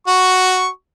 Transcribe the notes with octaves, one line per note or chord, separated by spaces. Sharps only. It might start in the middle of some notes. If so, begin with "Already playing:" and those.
F#4 C#6